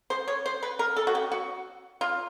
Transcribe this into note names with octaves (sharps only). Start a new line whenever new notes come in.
C5
C#5
C5
B4
A#4
A4
F#4
G4
F#4
F4